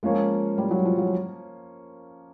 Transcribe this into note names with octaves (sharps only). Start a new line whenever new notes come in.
F3 G#3 A#3 C#4 F4
G3
F#3
F3
F#3